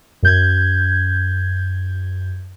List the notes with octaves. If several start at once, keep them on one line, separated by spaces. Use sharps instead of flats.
F#2 G6 G#6